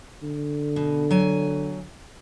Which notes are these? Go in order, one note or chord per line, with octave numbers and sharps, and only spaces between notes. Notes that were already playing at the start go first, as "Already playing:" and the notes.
D3
B2
F#3 G#5